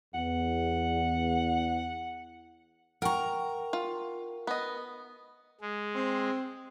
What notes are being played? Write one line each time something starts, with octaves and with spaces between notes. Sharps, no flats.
E2 F#5
A#4 F#5 G5 A#5 C#6
F4
B3 D#5
G#3
C4